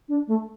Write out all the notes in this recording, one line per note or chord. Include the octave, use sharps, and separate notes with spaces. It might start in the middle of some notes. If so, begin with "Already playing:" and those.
D4
A3